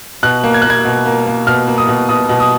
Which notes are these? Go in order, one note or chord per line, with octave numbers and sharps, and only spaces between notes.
B2 F#6
A#3
G#6
A#3 F#6
G#6
B2
A#3
A#3
B2 F6
A#3
D#6
B2
B2 D#6
B2
D#6